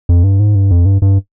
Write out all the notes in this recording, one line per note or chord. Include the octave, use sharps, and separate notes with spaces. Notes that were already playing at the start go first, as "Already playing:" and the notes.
F2
G2
G#2
G2
F2
G2
G2